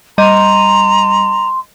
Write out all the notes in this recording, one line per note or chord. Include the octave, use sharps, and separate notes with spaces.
G3 D#5 A#5 C6 D#7